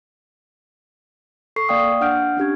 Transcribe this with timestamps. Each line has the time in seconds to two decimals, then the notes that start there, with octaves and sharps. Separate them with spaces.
1.56 A4 C#6 C7
1.69 A#3 D5 F5 G5 D#6
2.01 D4 F#5 F6 G6 D7
2.37 C#4 D4 G4 G#6